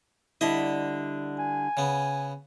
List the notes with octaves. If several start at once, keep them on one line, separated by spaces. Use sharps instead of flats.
D3 G3 E4 D#5
G#5
C#3 B3